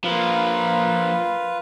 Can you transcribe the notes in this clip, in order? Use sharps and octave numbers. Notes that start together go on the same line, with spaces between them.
F3 A#3 F4 B4